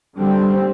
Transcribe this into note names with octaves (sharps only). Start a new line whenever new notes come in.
D3 G3 C4